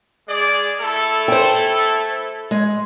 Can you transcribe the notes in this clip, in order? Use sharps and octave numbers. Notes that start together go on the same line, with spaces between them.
G#3 G#4 D5
A3 E4 A4
C5 G5
G#3